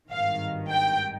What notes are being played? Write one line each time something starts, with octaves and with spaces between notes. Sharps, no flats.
G#1 G2 D#3 F5
G5